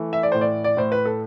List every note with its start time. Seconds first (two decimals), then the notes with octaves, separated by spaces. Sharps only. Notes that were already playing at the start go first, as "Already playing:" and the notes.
Already playing: E3 A3
0.13 E5
0.23 D5
0.32 A2 C5
0.41 D5
0.64 D5
0.77 A2 C5
0.92 B4
1.05 A4